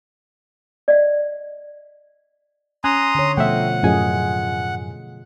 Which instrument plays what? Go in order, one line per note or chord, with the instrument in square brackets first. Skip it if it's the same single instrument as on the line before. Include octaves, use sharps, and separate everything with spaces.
[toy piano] D5 D#5 F5
[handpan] C#4 [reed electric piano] G#5 F#6 [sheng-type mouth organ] A#5 C6 D#6
[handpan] D3 C#5
[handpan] B2 F3 A3 [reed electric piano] E5 G5 [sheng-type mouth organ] F#5
[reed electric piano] F#2 A2 G#5 [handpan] F4 G#4 D#5